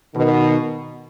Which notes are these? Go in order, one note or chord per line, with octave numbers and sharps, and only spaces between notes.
B2 D#3